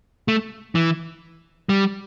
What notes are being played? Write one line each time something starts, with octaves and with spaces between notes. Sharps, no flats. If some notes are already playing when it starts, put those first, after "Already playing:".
A3
E3
G3